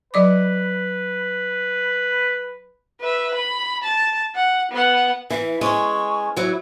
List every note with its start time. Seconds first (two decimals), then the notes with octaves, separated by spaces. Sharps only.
0.14 F#3 B4 D5 D6
3.01 B4 E5
3.34 B5
3.84 A5
4.35 F#5
4.72 B3 F#5
5.30 E3 E5
5.61 G#3 C#4 C#6
6.37 E3 F#3 E4